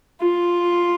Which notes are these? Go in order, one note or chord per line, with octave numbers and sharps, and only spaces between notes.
F4